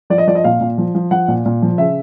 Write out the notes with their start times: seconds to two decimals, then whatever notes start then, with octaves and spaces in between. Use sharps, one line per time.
0.10 F3 D5
0.18 D#5
0.27 F3 D5
0.35 D#5
0.44 A#2 F5
0.61 A#2
0.78 F3
0.95 F3
1.11 F3 F#5
1.28 A#2
1.46 A#2
1.62 F3
1.78 C#3 E5